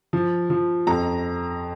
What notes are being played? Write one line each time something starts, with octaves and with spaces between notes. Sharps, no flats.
F3
F3
F2 A#5